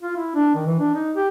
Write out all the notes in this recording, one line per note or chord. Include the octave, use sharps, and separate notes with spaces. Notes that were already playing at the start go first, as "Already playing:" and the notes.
F4
E4
D4
D#3
E3
D4
D#4
G4